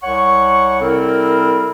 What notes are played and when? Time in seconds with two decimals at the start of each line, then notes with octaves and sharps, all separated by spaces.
0.03 C2 C#5 F#5 C#6
0.81 C3 G3 C4 E4 A4 A#4